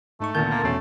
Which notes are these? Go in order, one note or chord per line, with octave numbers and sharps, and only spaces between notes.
G#2 A3 D#4 C#6
D2 A#2 D#3 B3 A5 G6
A#3
E2 B2 A3 C#4